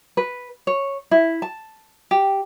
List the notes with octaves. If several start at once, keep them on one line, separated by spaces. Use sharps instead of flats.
B4
C#5
E4
A5
G4